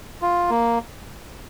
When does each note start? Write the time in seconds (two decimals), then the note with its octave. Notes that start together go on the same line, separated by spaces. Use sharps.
0.22 F4
0.50 A#3